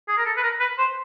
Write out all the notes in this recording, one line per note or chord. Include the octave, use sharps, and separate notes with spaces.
G#4
A#4
A4
B4
A#4
B4
C5